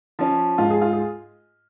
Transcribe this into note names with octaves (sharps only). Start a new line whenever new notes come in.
F3 C#4
G#2 F4
G#4
F4
G#4